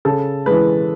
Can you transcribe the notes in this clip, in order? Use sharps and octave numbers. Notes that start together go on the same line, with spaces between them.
C#3 A4
E3 G#3 B4